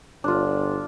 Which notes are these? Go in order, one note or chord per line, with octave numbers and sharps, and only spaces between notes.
G1 D4 F4